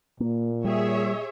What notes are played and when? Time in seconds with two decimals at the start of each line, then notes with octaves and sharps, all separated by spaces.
0.20 A#2 A#3
0.65 G3 G#4 C#5 E5